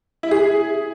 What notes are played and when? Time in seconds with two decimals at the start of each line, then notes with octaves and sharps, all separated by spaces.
0.23 E4
0.31 G#4